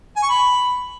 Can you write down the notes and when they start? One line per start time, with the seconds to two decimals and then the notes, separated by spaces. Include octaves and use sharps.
0.16 G#5
0.23 C#6
0.29 B5